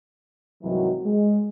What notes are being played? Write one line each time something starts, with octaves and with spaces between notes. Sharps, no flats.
C2 G#2 D#3 E3 F#3
G#3